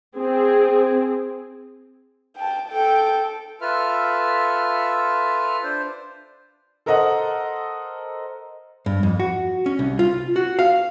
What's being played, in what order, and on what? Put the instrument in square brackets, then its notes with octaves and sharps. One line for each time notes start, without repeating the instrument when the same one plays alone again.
[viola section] C4 G#4
[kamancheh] G5 A5
A4 G5
[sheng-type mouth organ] F4 A4 B4 E5 F6
D4 C5
[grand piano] A4 A#4 C5 D#5 F#5
[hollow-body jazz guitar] G2
F2
F#4
C#4
C2
F4
F#4
F5